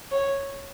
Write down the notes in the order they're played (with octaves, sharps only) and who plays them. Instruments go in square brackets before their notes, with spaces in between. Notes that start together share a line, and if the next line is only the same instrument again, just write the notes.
[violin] C#5